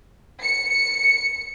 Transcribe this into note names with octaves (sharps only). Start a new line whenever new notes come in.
C#7